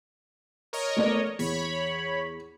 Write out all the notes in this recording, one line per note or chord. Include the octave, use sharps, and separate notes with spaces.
A#4 C#5 D#5
A3 B3 D5
E2 C#5 B5